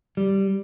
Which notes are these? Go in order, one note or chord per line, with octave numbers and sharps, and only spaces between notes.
G3